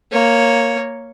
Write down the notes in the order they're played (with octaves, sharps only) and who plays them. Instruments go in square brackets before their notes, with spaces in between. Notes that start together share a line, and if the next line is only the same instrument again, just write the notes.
[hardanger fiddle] A#3 C#5